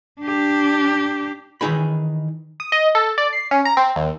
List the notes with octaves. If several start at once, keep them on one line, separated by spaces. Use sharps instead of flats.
D4 G4
D#3 E3 D#4 G#4 B5
D#6
D#5
A4
D5
C7
C#4
A#5
C4
D#2